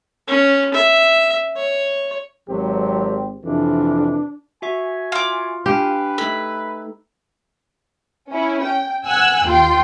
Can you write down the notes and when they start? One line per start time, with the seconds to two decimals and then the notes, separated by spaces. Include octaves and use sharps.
0.27 C#4
0.74 E5
1.56 C#5
2.49 G#1 F#3 C4 G4
3.43 F2 C3 E3 D4
4.62 F#4 E5 G#5 C#6
5.12 F4 D6
5.66 D4 G4 B4 F5 G#5
6.18 A3 D#4 A4 B5
8.31 C#4 E4
8.64 G5
9.06 F#5 G#5 E6 F#6
9.45 D#2 F4 G5 C6